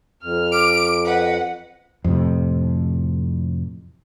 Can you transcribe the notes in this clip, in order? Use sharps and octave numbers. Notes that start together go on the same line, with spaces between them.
F2 F6
D6 D7
B4 D#5 F#5
F2 A2 C3